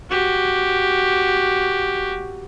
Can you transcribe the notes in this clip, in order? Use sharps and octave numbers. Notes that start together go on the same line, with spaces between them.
F#4 G4